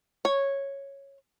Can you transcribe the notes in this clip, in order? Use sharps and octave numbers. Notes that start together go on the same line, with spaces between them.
C#5